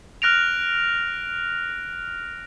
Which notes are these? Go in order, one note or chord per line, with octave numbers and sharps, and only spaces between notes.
F6 F#6 A#6 D7 F7